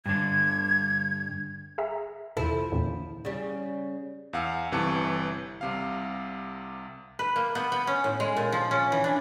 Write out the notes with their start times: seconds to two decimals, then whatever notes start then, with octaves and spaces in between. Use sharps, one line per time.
0.06 G2 D3 G#6
1.78 G#4 E5 A#5
2.37 E2 C3 F3 E4 A4
2.72 E2 A#2 D3
3.25 C#3 G3
4.33 E2 F5 F#5 E6 C#7
4.72 G1 C3 E3 A5 C#6 C#7
5.61 C2 C3 F5
7.19 B4
7.36 A#3
7.55 B3
7.72 B3
7.87 C#4
8.04 A2
8.20 G#3
8.37 A#2
8.52 F3
8.71 C#4
8.92 E3
9.04 D4